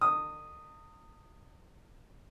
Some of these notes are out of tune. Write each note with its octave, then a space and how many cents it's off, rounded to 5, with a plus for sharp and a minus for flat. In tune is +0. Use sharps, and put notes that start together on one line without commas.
D#3 -45 D#6 -5